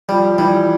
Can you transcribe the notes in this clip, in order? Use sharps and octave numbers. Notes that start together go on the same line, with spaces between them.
F3 G3
E3 G3